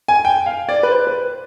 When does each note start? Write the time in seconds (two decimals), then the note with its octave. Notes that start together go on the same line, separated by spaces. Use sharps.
0.08 G#5
0.25 G5
0.46 F5
0.69 D5
0.83 B4
0.91 C5
1.07 B4